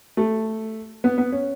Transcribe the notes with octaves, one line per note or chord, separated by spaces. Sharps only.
A3
B3
B3
C#4